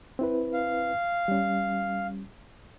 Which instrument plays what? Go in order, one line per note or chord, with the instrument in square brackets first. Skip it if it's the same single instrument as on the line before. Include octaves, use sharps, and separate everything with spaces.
[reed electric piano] C4 E4 B4
[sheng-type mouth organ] F5
[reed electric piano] G3 C#4